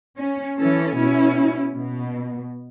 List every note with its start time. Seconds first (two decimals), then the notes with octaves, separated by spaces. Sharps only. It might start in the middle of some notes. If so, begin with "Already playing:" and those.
0.17 C#4
0.58 E3 C#4 A4
0.97 B2 C#4 E4
1.74 B2